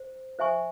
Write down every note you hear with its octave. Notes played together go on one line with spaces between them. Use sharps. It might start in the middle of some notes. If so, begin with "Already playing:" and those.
Already playing: C5
C5 E5 G#5 C#6